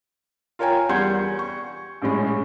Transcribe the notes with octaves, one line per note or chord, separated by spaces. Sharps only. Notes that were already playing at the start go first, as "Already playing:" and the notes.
F4 A#4 C#5 G5 G#5 A#5
E2 G3 F#5 C6 G6 G#6
C#6
A#1 F#2 A2 G#3